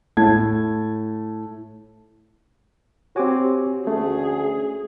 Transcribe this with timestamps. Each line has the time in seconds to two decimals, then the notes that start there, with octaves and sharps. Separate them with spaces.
0.17 A2 A5 G#6
3.16 C4 F#4 G4 C#5 G#5 D6
3.87 D2 A3 C#4 G#4